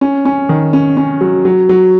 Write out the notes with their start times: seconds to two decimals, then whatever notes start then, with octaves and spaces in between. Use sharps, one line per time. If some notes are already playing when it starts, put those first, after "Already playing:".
0.01 C#4
0.25 C#4
0.49 D#3
0.73 C#4
0.97 C#4
1.21 F#3
1.45 F#3
1.69 F#3